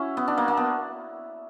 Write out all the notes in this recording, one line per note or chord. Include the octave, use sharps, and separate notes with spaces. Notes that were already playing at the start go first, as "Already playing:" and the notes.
Already playing: C#4 E4 F#4
B3
D4
A#3
A#3
B3